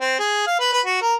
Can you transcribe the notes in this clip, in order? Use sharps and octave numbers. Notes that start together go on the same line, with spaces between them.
C4
G#4
F5
B4
B4
F#4
A#4